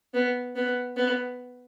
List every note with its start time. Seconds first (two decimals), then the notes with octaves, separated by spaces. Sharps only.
0.14 B3
0.56 B3
0.96 B3